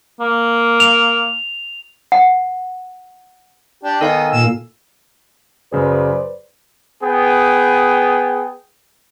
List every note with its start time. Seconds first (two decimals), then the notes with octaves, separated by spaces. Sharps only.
0.20 A#3
0.80 F7
2.12 F#5
3.83 D4 G4
4.01 D#3 B3 D#4 A4 F5 G#5
4.32 A#2 E6
5.73 F#2 C#3 G#4 B4 C5 D5
7.03 B3 G#4 G5